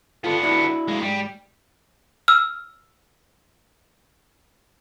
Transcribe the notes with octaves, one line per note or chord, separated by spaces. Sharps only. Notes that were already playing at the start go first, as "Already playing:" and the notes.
D3 B3 F4 A4
D4 E4 F#4
G#3 A#3
G#2 G3
E6 F6